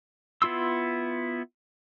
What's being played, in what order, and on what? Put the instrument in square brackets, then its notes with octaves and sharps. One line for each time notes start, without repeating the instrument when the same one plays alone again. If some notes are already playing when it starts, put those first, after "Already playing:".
[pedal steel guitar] B3 E4 F4 C6 E6